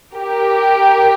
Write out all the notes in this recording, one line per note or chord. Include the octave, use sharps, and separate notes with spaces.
G4 A#4